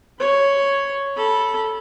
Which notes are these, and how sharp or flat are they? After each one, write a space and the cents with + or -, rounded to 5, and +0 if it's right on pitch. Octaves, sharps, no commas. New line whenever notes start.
C#5 +0 B5 +45
A4 +0 B5 -20